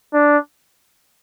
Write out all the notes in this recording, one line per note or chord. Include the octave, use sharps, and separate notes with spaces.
D4